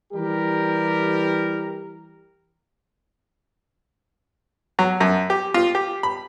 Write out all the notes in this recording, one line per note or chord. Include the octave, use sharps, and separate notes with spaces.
E3 G3 G4 A#4
F#3
F#2
G4
F4
G4
B5